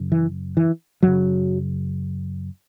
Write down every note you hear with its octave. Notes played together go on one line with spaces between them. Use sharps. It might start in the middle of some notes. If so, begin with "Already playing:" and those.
Already playing: F#2 C#3
E3
E3
F#2 C#3 F#3